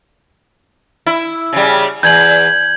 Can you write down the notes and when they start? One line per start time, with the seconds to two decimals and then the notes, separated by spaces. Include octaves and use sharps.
1.07 E4
1.53 C#3 G3
2.03 E2 G6 G#6 F#7